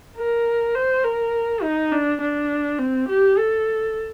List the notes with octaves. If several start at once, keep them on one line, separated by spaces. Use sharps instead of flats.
A#4
C5
A#4
D#4
D4
D4
C4
G4
A4